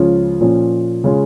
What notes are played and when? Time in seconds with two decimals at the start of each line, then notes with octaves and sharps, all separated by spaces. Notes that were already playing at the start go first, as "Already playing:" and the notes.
Already playing: C#2 C#3 F3 C#4 F4
0.41 A#2 F3 C#4
1.04 C#3 G#3 C#4 F4